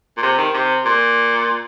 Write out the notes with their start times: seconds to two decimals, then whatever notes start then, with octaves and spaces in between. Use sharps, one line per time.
0.17 A#2
0.23 C3
0.38 D#3
0.54 C3
0.85 A#2